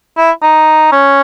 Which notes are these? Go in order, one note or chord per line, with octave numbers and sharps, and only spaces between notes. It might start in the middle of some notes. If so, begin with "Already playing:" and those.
E4
D#4
C#4